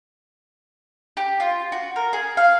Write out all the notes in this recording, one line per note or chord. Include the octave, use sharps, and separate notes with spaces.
G4
F4
F#4
A#4
G#4
F5